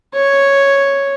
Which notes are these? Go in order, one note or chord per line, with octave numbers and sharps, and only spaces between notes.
C#5